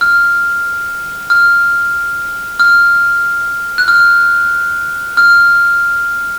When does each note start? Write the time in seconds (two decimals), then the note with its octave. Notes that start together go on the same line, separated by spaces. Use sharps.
0.01 F6
1.30 F6
2.60 F6
3.78 F#6
3.88 F6
5.17 F6